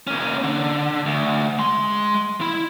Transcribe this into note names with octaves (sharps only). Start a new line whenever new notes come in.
A#3 C#4
D3
D2
G#3 C6
E4